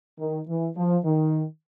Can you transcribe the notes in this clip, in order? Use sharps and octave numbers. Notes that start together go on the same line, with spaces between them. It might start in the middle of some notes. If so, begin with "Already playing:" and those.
D#3
E3
F3
D#3